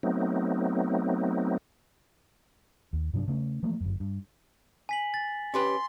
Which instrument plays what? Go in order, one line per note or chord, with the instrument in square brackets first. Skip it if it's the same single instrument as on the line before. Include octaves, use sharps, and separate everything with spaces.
[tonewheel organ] F#3 A3 B3 C4 D#4
[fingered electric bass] D#2
G2 C3 F#3 D4
C#3 A3 C#4
E3 F3 A3 A#3
G1 F#2
G2
[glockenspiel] G#5 B6 F#7
A6
[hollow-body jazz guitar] C#4 G4 B4 [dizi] C6